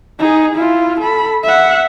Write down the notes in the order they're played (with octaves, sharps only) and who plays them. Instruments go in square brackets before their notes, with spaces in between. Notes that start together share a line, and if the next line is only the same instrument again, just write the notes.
[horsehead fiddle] D#4 G#4
E4 F4
A4 B5
E5 F#5